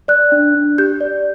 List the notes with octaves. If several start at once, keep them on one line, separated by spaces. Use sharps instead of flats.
D5 F#6
D4
D4
G4 G6
D5